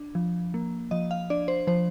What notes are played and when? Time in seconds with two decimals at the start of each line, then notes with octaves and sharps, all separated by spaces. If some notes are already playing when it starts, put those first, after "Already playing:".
Already playing: D4
0.15 F3
0.54 A#3
0.91 F3 D#5
1.11 F5
1.30 D4 D5
1.48 C5
1.67 F3 C5